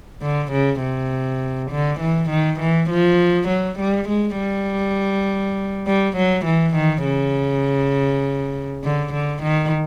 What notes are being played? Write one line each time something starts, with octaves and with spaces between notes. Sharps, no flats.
D3
C#3
C3
D3
E3
D#3
E3
F3
F#3
G3
G#3
G3
G3
F#3
E3
D#3
C#3
D3
D3
D#3